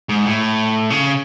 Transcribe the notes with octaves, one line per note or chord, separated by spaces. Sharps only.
G#2
A2
C#3